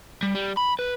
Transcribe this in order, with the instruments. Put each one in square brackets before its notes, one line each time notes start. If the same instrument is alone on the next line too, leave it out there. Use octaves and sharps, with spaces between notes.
[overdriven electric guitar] G3
G3
B5
B4